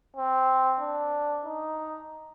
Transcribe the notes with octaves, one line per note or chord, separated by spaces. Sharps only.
C4
D4
D#4